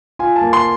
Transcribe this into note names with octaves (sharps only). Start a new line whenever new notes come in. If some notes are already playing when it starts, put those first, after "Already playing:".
F4 G#5
A5
A#3
C6